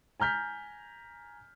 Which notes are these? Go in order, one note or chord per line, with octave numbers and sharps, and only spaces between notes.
G#5 A#5 F6 G6 B6